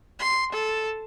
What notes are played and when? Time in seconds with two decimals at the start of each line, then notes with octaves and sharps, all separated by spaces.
0.19 C6
0.52 A4